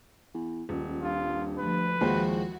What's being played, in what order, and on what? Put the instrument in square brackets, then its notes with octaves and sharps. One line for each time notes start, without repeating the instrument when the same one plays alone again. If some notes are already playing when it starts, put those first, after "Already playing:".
[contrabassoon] E2
[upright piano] D#1 [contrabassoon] C#2
[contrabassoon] G2 [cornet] F4
[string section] D2 F3 [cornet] B4
[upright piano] D#2 G#3 C5 [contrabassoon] A#2 [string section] F3 E4 F#4